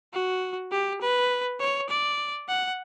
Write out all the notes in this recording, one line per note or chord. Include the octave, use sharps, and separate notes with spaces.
F#4
G4
B4
C#5
D5
F#5